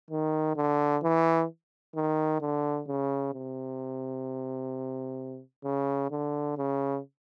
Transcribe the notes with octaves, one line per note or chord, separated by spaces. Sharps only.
D#3
D3
E3
D#3
D3
C#3
C3
C#3
D3
C#3